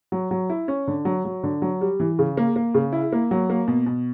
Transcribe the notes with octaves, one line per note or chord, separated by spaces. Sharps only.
F#3
F#3
E4
C#4
D3
F#3
F#3
D3
F#3
G3
E3
C#3
A#3
A#3
C#3
E4
A#3
F#3
A#3
B2
B2